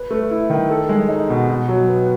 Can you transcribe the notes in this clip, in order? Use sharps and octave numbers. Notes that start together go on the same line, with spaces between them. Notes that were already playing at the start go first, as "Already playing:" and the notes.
Already playing: B4
A3
E4
D#3
A4
G#3
D#4
B2
B2
F#3
B3